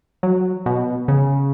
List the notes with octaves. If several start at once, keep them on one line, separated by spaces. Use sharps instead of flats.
F#3
B2
C#3